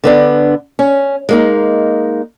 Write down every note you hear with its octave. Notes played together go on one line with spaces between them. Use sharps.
D3 B3 D4
C#4
G#3 A#3 D#4